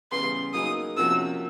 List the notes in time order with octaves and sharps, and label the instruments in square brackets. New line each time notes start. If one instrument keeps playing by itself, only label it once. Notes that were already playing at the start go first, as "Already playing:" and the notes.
[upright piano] C#3 E3 G3 B3 [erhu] C6
[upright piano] F#3 A#3 D#4 G#4 [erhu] D#6
[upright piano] C3 F3 A#3 C#4 F#4 [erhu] E6